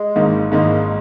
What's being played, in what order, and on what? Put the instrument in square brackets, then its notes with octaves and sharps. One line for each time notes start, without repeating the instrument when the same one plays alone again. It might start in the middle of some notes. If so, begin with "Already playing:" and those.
Already playing: [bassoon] G#3
[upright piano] G#1 G#2 D#3 A#3 D#4
[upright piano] G#1 G#2 D#3 A#3 D#4 [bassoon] G#3